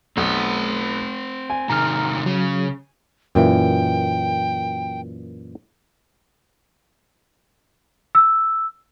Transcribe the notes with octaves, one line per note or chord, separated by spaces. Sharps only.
B1 C4 F#5
G#5
C3 D#3 A#5 F6
C#3 F#3
F#2 A#2 E3 G5
E6